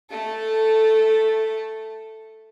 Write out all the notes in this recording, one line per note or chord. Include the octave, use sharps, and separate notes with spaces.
A3 A4